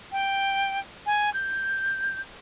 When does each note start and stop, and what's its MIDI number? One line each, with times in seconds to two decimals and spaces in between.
0.12 0.80 79
1.06 1.32 80
1.34 2.21 91